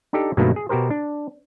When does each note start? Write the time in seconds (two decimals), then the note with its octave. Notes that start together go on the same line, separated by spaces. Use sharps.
0.13 D4 D#4 G4 A4
0.37 G2 B2 D#3 F#3 A3 A#3
0.56 G#4
0.69 B2 F#4 G4 A#4 C5
0.90 D4